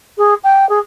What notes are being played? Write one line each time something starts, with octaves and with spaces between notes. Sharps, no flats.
G#4
G5
G#4